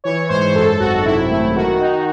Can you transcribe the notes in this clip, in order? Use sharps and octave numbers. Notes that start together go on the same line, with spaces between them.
E3 C#5
G#2 C5
F#2 A4
G#1 F#4
C3 E4
A3 E4
D#3 F#4
D#4